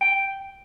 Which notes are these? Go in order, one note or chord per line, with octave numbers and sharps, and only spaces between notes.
G5